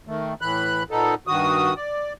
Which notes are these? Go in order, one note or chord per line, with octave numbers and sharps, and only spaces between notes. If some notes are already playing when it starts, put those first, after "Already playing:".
D#3 A3
A2 E3 B5 F#6
A#2 B3 D#4 A4
G2 D#3 F#4 D#6
D5